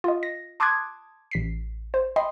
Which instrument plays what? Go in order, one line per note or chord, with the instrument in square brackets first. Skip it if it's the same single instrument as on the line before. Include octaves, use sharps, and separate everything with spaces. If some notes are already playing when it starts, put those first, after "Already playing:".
[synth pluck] F4 D#5
A#6
A5 C6 D6 D#6 F#6 G#6
A1 B6 C7
C5
D#5 G5 B5 C6